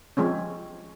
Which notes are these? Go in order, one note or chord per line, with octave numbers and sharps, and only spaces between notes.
F3 G#3 C4 C#4